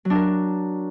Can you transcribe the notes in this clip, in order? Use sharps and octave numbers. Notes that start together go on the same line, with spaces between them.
F#3 D4 A#4